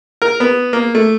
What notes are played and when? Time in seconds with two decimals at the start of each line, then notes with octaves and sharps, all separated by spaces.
0.22 A#4
0.40 B3
0.73 A#3
0.95 A3